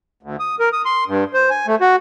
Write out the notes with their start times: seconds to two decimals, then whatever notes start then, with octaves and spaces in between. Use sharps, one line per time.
0.23 D2
0.40 D#6
0.59 A#4
0.73 D#6
0.85 C6
1.08 G2
1.34 C5
1.50 G#5
1.67 A3
1.81 F#4